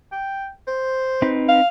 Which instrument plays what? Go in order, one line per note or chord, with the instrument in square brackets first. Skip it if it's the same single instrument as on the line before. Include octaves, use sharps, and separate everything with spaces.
[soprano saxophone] G5
C5
[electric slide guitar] C4 D#4 B4
[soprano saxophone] F5